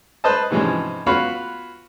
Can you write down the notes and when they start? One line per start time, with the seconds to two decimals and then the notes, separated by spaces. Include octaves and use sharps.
0.24 B4 C5 D#5 A5
0.51 G#2 C3 E3 F3 G#3 C#4
1.06 B3 F4 F#4 C#5 F5 B5